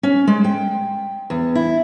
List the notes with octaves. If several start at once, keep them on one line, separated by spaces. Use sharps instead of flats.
C#4
G#3
G5
E2
E4